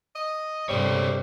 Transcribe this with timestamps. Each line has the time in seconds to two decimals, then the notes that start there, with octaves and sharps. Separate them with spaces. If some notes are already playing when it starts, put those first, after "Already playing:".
0.15 D#5
0.69 G2 C3 G3 A4 C5 C#5